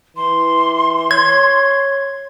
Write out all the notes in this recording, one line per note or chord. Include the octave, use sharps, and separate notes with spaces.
E3 C6
C#5 G#6